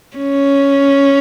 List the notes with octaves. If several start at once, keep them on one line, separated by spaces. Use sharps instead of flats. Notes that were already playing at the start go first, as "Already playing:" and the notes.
C#4